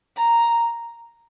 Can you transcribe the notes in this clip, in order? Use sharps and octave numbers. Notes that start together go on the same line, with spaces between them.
A#5